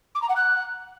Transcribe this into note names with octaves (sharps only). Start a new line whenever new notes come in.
D6
A#5
F#5
F#6